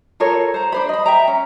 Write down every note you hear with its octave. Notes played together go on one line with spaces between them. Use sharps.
F4 A4 A#4 C#5
C5 A#5
D4 C5 B5
D#5 B5
E5 G5 A#5
C#4